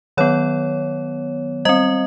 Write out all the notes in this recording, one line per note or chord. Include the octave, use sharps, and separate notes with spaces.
D#3 F#3 B3 C#5
G3 C4 D#5